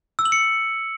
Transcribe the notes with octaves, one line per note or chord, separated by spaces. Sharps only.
E6
F#7
C#7